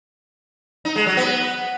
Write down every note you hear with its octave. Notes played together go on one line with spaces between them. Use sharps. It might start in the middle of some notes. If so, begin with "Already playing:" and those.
D#4
G#3
F#3
B3